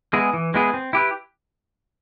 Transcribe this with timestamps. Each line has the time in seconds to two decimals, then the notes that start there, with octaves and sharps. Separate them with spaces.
0.13 G#3 B3 E4 G#4
0.34 E3
0.54 G#3 B3 E4 G#4
0.74 C4
0.93 E4 G4 B4